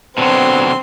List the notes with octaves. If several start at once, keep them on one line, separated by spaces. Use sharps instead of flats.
B2 D3 F#3 C4 C6